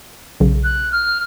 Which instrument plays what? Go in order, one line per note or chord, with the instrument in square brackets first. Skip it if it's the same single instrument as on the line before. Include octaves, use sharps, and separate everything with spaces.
[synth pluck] B1 C#3
[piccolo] F#6
F6